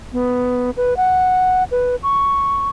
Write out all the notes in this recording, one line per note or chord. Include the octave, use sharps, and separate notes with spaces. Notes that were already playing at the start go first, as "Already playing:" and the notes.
B3
B4
F#5
B4
C#6